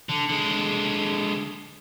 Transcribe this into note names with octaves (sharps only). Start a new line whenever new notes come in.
D3
D3 G#3